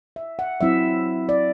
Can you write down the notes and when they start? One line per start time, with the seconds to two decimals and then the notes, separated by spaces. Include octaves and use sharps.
0.16 E5
0.39 F#5
0.61 F#3 C4 E4 E5
1.29 D5